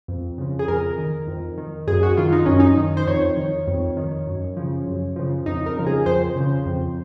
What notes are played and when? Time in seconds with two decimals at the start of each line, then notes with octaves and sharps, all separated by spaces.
0.08 F2
0.38 C#3 F3
0.59 G#4
0.68 F2 A#4
0.98 D#3
1.28 F2
1.58 D#3
1.87 F#2 G#4
2.03 F#4
2.17 D#3 F4
2.32 D#4
2.46 F#2 C#4
2.60 D#4
2.77 D#3
2.97 C5
3.07 F2 C#5
3.37 D#3
3.67 F2
3.97 D#3
4.27 F#2
4.57 C#3 F3
4.87 F#2
5.16 C#3 F3
5.46 F2 D#4
5.66 A#4
5.76 C#3 F3
5.86 G#4
6.06 F2 C5
6.36 C#3 F3
6.66 F2